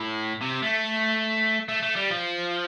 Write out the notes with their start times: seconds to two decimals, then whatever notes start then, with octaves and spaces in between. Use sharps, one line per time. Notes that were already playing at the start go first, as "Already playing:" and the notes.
Already playing: A2
0.41 C3
0.63 A3
1.68 A3
1.83 A3
1.96 G3
2.10 F3